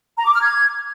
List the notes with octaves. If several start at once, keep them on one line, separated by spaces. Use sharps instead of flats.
A#5
D6
F6
G#6